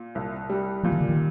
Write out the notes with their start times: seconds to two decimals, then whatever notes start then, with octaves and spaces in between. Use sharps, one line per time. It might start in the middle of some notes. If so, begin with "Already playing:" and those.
Already playing: A#2
0.15 C2
0.50 G3
0.83 A#2 F3
0.92 D#3
1.01 D3
1.09 D#3